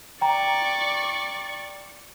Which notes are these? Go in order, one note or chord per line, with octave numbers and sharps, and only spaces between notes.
D5 G5 A#5 C#6